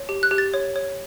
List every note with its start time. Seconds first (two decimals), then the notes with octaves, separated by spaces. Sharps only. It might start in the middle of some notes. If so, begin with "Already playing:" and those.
Already playing: C#5
0.09 G4
0.23 F#6
0.31 G4
0.38 A6
0.54 C#5
0.76 C#5